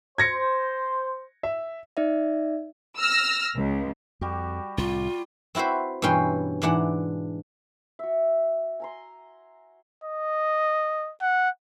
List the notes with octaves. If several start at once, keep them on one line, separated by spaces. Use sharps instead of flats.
C5 G#6 A#6 C#7
E5
D#4 D5 E5
E6 F6 A#6
C#2
F2 G3 F#4 G4
C2 A2 F4
C4 E4 F#4 B4 C5
G2 B2 E3 C#4 G5 C6
G#2 E3 D4 F#5
F#4 E5
G#5 A#5 C6
D#5
F#5